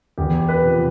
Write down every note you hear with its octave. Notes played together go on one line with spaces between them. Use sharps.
E2 G4
B4
C3 F3